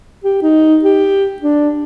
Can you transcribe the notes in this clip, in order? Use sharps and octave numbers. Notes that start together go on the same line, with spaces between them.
G4
D#4
G4
D4